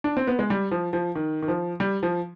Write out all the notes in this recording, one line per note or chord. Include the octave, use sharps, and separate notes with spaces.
D4
C4
B3
G#3
G3
F3
F3
D#3
D#3
F3
G3
F3